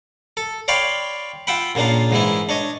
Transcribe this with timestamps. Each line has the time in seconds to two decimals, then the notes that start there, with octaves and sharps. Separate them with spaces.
0.37 A4
0.68 C#5 D5 F5 G5 B5 C6
1.47 F4 E5 F#5 G5 B5
1.75 A#2 C#3 A#3 D4 F4
2.11 G#2 E3 G#3 E4
2.49 D4 C#5 D#5